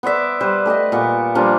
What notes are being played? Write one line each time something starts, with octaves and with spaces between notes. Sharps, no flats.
B3 C5 D5 E5
G3 B4 C5
A3 G4 B4 D#5
A#2 B3 C#6 D6
F3 G3 A#3 D4